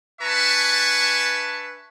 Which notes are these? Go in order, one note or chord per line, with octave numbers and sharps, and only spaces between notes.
D4 B4 E5 G#5 A5 C#6